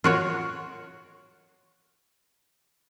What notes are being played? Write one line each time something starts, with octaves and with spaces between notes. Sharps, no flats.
F4 F#4 C#5